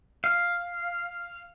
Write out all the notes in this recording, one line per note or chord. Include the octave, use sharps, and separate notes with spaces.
F5